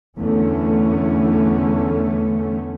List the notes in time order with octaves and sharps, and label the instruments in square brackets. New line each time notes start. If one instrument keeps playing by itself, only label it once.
[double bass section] E2 D3 A3 C#4